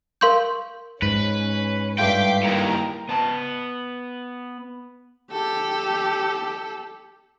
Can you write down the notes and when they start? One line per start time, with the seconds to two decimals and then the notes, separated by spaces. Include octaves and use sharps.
0.21 A#4 F5 C6 C#6 G6
1.02 G#2 C#4 B4
1.98 G2 A3 F4 G5 D6 B6 C7
2.43 D#2 A2 G4 A#4 A#5
3.09 B3 A5
5.32 G4 A4